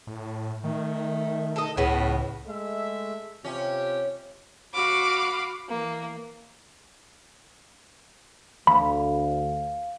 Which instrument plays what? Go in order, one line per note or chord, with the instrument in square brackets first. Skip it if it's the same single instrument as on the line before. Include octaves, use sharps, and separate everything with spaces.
[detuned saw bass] A2
[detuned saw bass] D#3 [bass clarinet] A3
[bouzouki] A4 D#5
[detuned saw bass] C#2 [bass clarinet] A2 [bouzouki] C#3 B3
[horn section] G#3 A3 E5
[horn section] C3 F4 G4 [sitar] C#4
[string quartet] F#4 F5 B5 D6
E3 A#3
[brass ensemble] D2 [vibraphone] F5 [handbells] B5